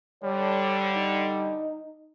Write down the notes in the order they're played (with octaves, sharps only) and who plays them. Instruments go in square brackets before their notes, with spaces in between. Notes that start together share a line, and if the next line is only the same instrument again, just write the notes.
[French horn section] D3 [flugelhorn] G3 [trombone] C#5
[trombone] D#4